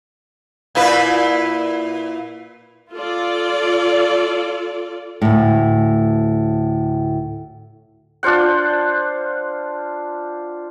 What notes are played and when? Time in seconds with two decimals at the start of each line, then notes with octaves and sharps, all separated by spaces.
0.75 A#2 E4 B4
2.93 F4 A4 D5
5.22 D2 A2
8.23 D4 F4 C5 F#5